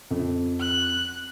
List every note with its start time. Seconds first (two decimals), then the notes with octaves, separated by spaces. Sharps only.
0.11 F2
0.60 F#6